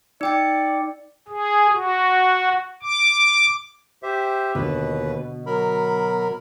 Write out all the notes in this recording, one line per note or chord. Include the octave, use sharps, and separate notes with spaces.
D#4 D5 G5 C#7
G#4
F#4
D6
G4 C5 E5
D#2 B2 D3 B4
F#3 A#4 B5